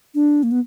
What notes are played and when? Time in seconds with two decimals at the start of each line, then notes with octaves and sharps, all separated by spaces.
0.15 D4
0.43 A#3
0.51 B3